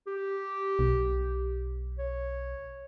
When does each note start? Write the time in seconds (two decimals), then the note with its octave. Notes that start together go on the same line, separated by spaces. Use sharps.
0.07 G4
0.79 B1
1.99 C#5